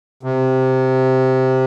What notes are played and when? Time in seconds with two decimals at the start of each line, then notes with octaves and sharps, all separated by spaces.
0.23 C3